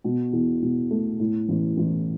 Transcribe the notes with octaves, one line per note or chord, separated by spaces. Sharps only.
B2
E2
B2
A3
A2
A1
A1